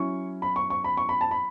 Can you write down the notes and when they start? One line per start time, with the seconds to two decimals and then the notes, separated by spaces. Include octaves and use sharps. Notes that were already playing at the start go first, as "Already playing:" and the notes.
Already playing: F#3 C#4 E4 C#6
0.42 B5
0.56 C#6
0.70 C#6
0.84 B5
0.97 C#6
1.09 B5
1.21 A5
1.31 B5